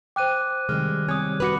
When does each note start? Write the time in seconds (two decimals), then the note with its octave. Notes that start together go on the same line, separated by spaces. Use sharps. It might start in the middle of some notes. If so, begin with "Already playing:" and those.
0.16 C5 G5 D6 F#6 D#7
0.69 C3 D#3 G3 G#3 F6
1.09 G3 C4 C#5 G#5 D#6 G#6
1.40 F#4 B4 B5 D6 C#7